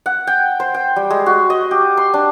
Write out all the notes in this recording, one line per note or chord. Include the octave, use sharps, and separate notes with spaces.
F#5
G5
C5
G5
G3
G#3
F#4
D#5
G4
C6
D4